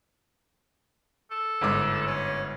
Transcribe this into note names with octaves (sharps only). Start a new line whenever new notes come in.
A4
G1 G#2 D6
C#4